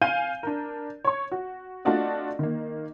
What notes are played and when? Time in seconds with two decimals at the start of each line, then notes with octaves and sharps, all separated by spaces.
0.02 F5 G#5 G6 D#7
0.43 D4 A#4
1.05 C#5 C#6
1.32 F#4
1.85 A3 D4 F4 F#4 D5 D#5
2.39 D#3 A#3